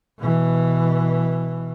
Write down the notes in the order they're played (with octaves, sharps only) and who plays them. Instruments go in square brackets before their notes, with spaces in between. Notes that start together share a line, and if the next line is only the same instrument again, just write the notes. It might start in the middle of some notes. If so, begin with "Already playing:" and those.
[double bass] B2 E3